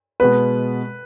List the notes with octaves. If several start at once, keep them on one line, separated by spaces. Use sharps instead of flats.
B2 G#3 B3 B4